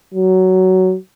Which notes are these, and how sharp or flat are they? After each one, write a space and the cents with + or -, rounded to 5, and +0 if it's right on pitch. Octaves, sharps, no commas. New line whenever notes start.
F#3 +15